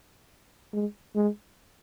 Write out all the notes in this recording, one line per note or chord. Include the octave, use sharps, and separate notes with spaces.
G#3
G#3